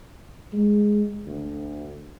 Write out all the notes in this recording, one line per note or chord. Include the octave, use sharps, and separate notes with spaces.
G#3
D2